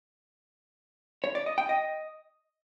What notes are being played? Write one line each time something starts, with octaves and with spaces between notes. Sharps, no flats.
C#5
D5
D#5
G5
D#5